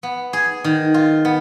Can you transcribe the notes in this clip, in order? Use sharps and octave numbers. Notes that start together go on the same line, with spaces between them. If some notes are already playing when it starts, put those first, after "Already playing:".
B3
G#4
D#3
F4
B3